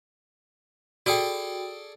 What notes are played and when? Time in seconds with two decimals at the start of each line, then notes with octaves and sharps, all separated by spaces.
1.06 F#4 G#4 A4 D5 G5